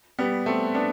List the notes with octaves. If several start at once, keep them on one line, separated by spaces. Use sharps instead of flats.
G3 B3
A3 C4
B3 D4